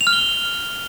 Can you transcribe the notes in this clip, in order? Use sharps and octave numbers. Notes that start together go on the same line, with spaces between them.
F7
F6
G7